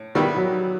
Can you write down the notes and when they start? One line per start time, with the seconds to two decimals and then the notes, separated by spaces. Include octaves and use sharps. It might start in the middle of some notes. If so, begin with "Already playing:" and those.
Already playing: A2
0.15 D#3 G3 B3 E4
0.36 F#3